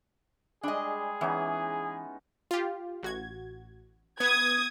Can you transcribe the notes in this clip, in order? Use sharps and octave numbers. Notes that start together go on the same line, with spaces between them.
G3 G#3 D4 G#4 D#5
E3 B3 C#4 D#4
F4 G4
A1 F#4 G#6
B3 D#6 G#6